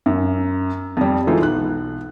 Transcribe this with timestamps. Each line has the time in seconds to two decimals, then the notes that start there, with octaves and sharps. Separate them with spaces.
0.06 F#2
0.97 F2 G3
1.27 E3 G#3 D#4 F4 A4
1.41 B1 F#6